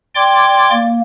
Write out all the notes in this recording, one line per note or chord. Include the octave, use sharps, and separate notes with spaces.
D5 G5 C6 D6 G#6
A#3